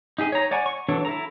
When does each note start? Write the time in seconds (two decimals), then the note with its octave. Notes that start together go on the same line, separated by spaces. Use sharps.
0.18 D#4 G4 G#4 D#5
0.32 C#5 A#5
0.51 C#5 D5 F#5 G#5 C#6
0.66 C#6
0.89 E3 F#3 D4 A4 C#5
1.05 E4 A4 A#5